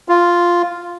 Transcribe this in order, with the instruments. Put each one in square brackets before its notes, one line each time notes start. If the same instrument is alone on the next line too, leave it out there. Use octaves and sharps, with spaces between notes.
[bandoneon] F4